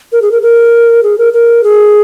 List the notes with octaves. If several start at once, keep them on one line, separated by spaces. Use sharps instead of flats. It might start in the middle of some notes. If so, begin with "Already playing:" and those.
A#4
G#4
A#4
A#4
G#4
A#4
A#4
G#4